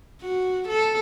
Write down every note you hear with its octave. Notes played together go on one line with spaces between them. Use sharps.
F#4
A4